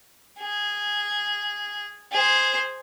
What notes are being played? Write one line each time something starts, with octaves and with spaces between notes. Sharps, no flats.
G#4
G#4 C5